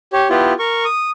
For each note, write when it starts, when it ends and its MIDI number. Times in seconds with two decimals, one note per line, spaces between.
0.13 0.28 67
0.13 0.28 73
0.30 0.53 59
0.30 0.53 64
0.30 0.53 65
0.30 0.53 67
0.59 0.85 70
0.59 0.85 85
0.85 1.11 87